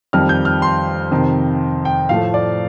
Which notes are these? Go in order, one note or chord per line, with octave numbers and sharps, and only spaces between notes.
F2 D#3 G3 F6
G6
F6
C6
F2 C3 D#3
G5
A2 F3 A3 F5
D5